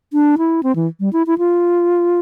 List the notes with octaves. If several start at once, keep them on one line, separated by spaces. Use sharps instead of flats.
D4
E4
C4
E3
G3
E4
E4
F4